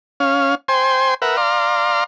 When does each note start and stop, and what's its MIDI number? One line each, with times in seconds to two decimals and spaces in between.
0.20 0.55 61
0.20 0.55 77
0.68 1.14 72
0.68 1.14 79
0.68 1.14 80
0.68 1.14 84
1.22 1.37 70
1.22 1.37 71
1.22 1.37 76
1.22 1.37 78
1.37 2.04 74
1.37 2.04 77
1.37 2.04 82
1.37 2.04 84